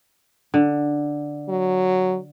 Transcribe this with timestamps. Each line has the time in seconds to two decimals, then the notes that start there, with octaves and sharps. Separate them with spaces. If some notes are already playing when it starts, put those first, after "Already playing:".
0.54 D3
1.49 F#3